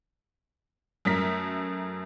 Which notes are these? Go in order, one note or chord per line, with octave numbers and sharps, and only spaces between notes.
F#2 A3 A#4 B6